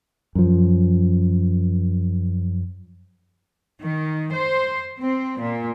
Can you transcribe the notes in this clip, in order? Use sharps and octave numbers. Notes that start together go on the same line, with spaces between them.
F#2 F3
D#3
C5
C4
A#2